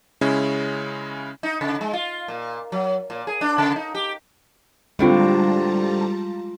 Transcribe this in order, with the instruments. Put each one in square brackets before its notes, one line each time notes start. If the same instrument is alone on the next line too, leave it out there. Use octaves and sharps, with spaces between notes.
[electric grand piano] C#3 G#3 C#4 E4
[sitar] D#4
C#3
G#3
F4
A#2
F#3
A#2
G#4
D4
C#3
D#4
G4
[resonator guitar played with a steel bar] A2 D3 C4 [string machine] G3 A5 A#5 [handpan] G#3 F4